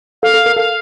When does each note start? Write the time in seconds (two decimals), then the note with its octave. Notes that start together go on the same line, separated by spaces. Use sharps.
0.23 A4 F5
0.34 A4
0.46 A#4
0.56 A4 F5